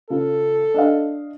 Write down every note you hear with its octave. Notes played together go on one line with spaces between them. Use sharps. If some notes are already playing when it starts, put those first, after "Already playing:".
C#3 F4 A4
D4 D#5 F5